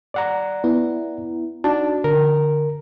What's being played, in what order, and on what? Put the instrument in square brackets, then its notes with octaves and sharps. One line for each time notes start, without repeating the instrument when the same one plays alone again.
[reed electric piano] D5 F#5 A#5
[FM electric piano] B3 E4
[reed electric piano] D4 [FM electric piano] D#4 F#4 A5
[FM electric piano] D3 [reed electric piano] A#4